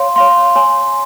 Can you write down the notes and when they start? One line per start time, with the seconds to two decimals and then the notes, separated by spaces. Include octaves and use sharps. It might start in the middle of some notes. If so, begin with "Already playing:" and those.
Already playing: C#5 F5 C6
0.16 C#5 F5 C6
0.56 C#5 G#5 C6